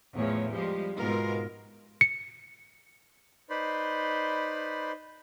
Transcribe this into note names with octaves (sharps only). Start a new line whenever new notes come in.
E2 A2 F3 A3 C#5
F3 G3 G#3 G4
G#2 B2 G#3 B3 F4 A#4
C#7
D#4 B4 C5 D5 B5 C6